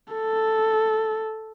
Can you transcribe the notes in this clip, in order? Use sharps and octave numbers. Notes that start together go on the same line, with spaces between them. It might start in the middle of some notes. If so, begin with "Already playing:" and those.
A4